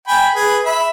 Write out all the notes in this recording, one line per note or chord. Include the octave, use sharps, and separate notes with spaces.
G5 G#5 B5
G#4 B4
E5 B5